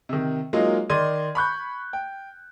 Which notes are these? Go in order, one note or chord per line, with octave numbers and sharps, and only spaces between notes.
C3 D#3
F#3 G#3 A#3 D#4 F4
D#3 D5 D#5 C6 G#6 D#7
B5 C#6 F#6 G6
G5